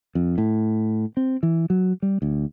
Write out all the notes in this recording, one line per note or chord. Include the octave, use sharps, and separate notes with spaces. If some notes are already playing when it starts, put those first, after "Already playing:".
F2
A2
C4
E3
F#3
G3
D2